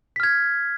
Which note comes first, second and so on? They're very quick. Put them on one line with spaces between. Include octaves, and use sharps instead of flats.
B6 F6 G#6